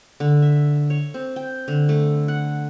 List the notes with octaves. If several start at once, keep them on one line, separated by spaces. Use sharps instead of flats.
D3
E5
C#5
C4
G5
D3
A3
F#5